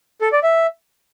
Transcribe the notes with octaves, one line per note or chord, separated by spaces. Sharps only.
A4
D5
E5